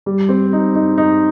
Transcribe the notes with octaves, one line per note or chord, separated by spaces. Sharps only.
G3
C4
D#4
D#4
D#4